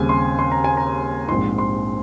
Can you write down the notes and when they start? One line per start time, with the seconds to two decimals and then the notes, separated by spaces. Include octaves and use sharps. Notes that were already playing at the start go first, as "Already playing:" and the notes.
Already playing: D#2 C#3 G3 C4 G#5
0.09 C6
0.39 C6
0.51 A#5
0.64 G#5
0.77 A#5
1.28 A#1 G#2 F3 C4 D#4 C6
1.58 C6